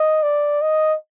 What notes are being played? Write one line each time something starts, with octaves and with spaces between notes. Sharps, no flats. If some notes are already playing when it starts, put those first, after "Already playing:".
Already playing: D#5
D5
D#5